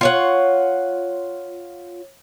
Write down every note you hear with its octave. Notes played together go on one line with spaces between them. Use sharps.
F4 C#5 F#5